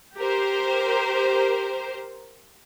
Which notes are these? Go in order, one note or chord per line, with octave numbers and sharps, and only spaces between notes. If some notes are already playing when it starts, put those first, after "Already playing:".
G4 A#4 C5